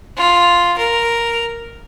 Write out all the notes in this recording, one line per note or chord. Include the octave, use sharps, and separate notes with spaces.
F4
A#4